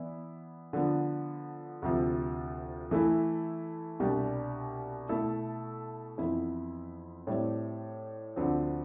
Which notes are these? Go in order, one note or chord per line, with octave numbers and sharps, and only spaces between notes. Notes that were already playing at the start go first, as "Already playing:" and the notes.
Already playing: E3 B3 E4 D5
D3 F3 B3
D2 C3 F3
E3 A3 E4
C2 B2 G3 D4 G4
B2 A3 E4 A4
F2 E3 B3 E4
A2 G3 C4
D2 D3 F3 C4